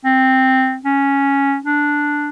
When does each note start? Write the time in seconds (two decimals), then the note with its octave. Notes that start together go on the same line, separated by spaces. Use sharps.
0.05 C4
0.85 C#4
1.65 D4